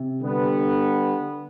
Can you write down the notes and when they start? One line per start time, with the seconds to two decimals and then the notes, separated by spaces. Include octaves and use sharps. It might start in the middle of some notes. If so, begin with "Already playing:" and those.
Already playing: C3
0.20 D3 G3 B3